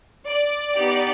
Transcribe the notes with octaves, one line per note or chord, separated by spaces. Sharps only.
D5
B3 D#4 G4